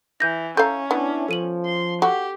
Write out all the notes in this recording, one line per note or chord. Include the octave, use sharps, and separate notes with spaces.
E3 G6 A#6
C#4 A4 F5 A#5 G6
B3 D4 E4
F3 A4 D#7 F#7
C6
F#4 G4 A4